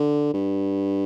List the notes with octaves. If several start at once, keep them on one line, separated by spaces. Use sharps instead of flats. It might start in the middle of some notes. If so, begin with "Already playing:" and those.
Already playing: D3
G2